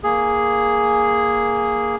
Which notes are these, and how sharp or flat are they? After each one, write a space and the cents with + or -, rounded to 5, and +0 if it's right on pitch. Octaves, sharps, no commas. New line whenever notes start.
A#3 +0 G#4 +0